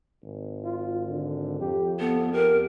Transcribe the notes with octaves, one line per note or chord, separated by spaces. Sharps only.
G#1
F4
D3
F2 G4
B3 A4
G4 A#4